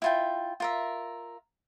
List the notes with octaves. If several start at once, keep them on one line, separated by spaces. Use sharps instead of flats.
E4 F4 G5
F4 A#4 E5